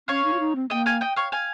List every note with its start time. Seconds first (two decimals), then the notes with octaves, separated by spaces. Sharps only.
0.08 C#4 C#5 F5
0.24 D#4
0.34 F4
0.40 D#4
0.56 C4
0.70 A#3 D#5 G5
0.86 F5 G#5
1.01 D#5 G5
1.16 C#5 F5
1.32 F5 G#5